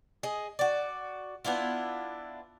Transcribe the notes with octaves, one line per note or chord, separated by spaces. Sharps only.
G#4 D#5
F#4 D5
B3 D4 E4 F4